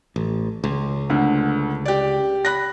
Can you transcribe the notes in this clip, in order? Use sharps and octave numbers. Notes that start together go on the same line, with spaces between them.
A1
C#2
D2 D3
G4 D5
B5 F#6 A#6